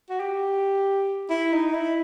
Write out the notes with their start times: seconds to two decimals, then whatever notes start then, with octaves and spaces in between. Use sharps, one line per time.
0.10 F#4
0.20 G4
1.30 E4
1.53 D#4
1.74 E4